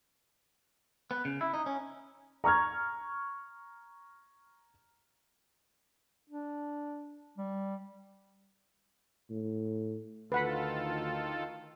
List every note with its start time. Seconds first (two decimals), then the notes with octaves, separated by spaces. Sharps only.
1.11 B3
1.25 C#3
1.41 E4
1.54 D#4
1.66 C#4
2.44 A#5 C#6 F6 G#6
6.30 D4
7.38 G3
9.30 A2
10.32 D2 D#3 F4 A4 B4 F#5 B5